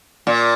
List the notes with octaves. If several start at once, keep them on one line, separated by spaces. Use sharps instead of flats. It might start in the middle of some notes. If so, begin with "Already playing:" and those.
A#2